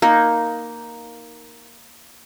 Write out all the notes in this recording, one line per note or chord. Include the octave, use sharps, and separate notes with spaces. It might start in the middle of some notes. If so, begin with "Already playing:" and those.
A#3 D#4